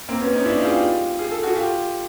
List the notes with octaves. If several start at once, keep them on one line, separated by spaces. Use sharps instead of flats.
A#3 C4
B3 C#4
C#4 D#4
D4 E4
D#4 F4
G#4
F4 G4
G#4
A4
F#4 G#4
F4 G4